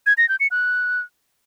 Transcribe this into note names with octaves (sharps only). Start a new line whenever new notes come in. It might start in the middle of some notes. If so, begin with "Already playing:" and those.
G#6
A#6
G6
C#7
F#6